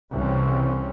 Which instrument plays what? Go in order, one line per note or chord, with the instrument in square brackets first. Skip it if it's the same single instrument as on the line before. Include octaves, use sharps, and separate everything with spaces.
[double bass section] C2 C#3 E3 C4 C#4